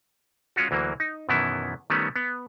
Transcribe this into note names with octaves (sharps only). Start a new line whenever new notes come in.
G#3 C#4 F4 F#4
D2 E3 F#3 A#3
D#4
F#2 B2 D#3 E3 B3 E4
D#3 G3 A3 B3 C#4
B3